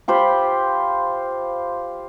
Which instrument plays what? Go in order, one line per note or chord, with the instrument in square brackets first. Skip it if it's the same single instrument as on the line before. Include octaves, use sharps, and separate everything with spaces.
[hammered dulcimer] F4 G4 C5 B5